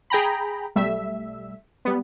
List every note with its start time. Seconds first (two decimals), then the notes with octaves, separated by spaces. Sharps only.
0.10 G#4 G5 A#5 B5
0.75 B1 G3 A3 E5
1.85 G3 B3